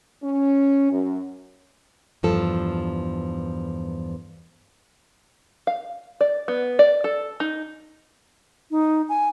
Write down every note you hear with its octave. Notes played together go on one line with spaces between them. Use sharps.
C#4
F#2
E2 G2 F3 A4
F5
D5
B3
D5
A4
D#4
D#4
G#5